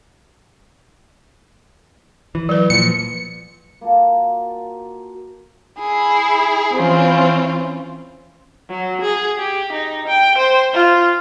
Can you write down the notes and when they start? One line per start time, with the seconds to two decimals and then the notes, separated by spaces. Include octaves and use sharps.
2.35 E3
2.49 F#3 B4
2.70 A#2 F3 C#7
3.81 A#3 F4 F#4 A4
5.78 E4 G#4
6.74 E3 C4 C#4 F4
8.70 F#3
9.01 G#4
9.38 G4
9.72 D#4
10.07 G5
10.38 C5
10.73 F4